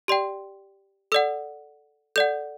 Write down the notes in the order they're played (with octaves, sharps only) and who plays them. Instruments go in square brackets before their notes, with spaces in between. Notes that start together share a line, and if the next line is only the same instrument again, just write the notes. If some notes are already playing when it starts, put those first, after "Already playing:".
[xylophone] G4 D5 G5 C6
A4 D5 F#5 E6
A4 D5 F#5 G6